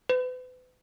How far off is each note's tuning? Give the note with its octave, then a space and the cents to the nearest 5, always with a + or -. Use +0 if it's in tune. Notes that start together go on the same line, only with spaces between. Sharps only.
B4 +40